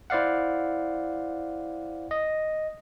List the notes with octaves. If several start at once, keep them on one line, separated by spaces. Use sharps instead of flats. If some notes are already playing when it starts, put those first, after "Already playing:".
E4 C5 D5 F5 F#5
D#5